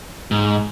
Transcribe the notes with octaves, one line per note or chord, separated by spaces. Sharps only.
G#2